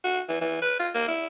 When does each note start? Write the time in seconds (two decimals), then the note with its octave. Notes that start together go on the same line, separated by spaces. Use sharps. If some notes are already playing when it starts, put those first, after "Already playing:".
0.04 F#4
0.29 E3
0.41 E3
0.62 B4
0.79 F4
0.94 A#3
1.08 E4